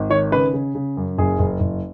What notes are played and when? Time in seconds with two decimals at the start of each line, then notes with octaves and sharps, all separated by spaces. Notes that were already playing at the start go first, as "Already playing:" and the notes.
Already playing: G#1
0.10 D#3 C#5
0.32 C#3 B4
0.53 C#3
0.75 C#3
0.97 F#2
1.18 F#1 G#4
1.39 F#1
1.60 F#1